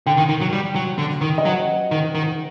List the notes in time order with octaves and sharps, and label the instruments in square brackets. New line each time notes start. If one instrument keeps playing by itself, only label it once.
[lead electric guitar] D3 [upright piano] G5
[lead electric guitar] D#3
D#3
F#3
G3
F#3
D3
D#3
[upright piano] D#5
[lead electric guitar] F#3 [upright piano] F#5
[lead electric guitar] D#3
D#3